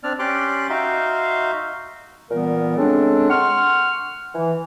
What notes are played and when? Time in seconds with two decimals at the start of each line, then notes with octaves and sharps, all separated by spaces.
0.03 C4 D4 D5 F6
0.19 C#4 G4 D5 C6 D6 F#6
0.69 D#4 F#4 E5 F5 C6
2.31 A#2 E3 G3 B3 A#4
2.77 C#3 G#3 C4 D4 A4
3.30 F#5 C6 C#6 F6
4.35 E3